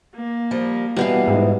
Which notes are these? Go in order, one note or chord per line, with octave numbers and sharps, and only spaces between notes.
A#3
F3 G3
B2 E3 G3 B3 F5
G#2